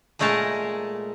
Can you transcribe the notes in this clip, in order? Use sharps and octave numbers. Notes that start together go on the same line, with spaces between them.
A#2 G#3 A3 G#4 A#4 A5